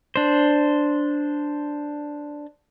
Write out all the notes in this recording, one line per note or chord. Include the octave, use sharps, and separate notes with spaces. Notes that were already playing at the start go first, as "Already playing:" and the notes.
D4 C5